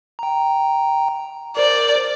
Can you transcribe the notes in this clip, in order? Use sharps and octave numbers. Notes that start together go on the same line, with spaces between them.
G5 A#5
A#4 C5 D5